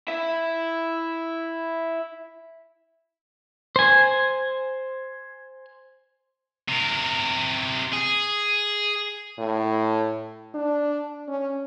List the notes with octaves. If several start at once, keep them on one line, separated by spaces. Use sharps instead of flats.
E4 E5
C5 G#5
C3 A#4
G#4
A2
D4
C#4